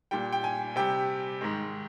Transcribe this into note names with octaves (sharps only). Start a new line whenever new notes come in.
A#2 G3 G5
G5
G#5
C3 G3 G5
G#2 D#3 G#3